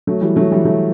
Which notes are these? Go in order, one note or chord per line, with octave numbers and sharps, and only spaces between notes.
F#3 A3
E3 G3
F#3 A3
E3 G3
F#3 A3